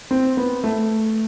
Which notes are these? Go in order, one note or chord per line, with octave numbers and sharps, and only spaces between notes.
C4
B3
A3